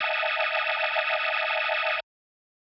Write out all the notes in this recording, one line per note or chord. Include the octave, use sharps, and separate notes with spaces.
D#5 E5 F#5 G#5 A5